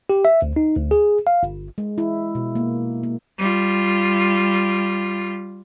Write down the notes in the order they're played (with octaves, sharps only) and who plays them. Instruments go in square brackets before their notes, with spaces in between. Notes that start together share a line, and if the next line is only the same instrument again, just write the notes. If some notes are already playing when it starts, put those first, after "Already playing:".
[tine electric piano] G4
E5
D2
D#4
D2
G#4
F5
G1
[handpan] G#3
E4
B2
A#3
A#3
[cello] G3 F4